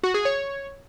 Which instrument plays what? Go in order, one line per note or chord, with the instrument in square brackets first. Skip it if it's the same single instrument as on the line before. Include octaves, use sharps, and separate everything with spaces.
[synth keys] F#4
G#4
C#5